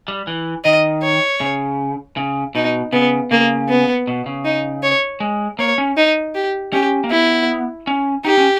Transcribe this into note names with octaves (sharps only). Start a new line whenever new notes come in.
G3
E3
D#3 D#5
C#5
C#3
C#3
B2 D#4
C#3 B3
C#3 A#3
B3
B2
C#3
D#4
C#5
G#3
A#3 C#5
C#4
D#4
G4
C#4 G4
A#3
B3 E4
C#4
D#4 G4
C#4